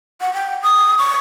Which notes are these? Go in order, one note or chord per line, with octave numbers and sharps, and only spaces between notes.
F#5
G5
D#6
C#6